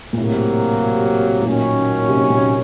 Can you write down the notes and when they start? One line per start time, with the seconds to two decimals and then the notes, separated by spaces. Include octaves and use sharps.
0.13 A#2
0.18 A2 C3 F#3 A#3
1.39 A2
1.45 F#2 A#2 D#3 A#3 C#4
2.09 C3
2.30 A#2